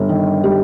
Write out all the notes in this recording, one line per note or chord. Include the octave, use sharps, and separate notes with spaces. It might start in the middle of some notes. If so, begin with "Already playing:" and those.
Already playing: G1
D#3
G3